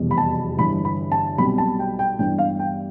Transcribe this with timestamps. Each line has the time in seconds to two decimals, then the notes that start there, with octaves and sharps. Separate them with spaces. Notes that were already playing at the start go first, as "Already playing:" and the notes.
Already playing: F1 E2 B2 G3
0.11 B5
0.18 A5
0.58 G1 G2 E3 B5
0.85 B5
1.12 A5
1.38 B1 B2 G3 C4 B5
1.58 A5
1.79 G5
1.99 G5
2.19 G2 E3 B3 D4 G5
2.38 F5
2.59 G5